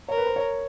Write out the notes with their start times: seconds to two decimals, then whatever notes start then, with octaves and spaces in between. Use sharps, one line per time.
0.08 A#4 C#5
0.17 B4
0.26 C5
0.36 C#5